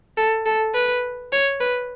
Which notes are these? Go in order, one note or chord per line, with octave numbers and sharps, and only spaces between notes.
A4
A4
B4
C#5
B4